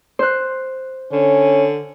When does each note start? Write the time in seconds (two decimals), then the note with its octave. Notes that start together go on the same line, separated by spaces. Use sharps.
0.19 C5 F#6
1.12 D3 C#4